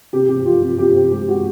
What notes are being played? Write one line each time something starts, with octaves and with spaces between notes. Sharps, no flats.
C3 G4
C3 G4
F3 F4
C3 F4
C3 G4
C4 G4
G#3 G4
G#3 F#4